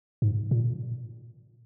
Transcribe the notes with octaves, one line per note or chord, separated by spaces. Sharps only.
G#2
A#2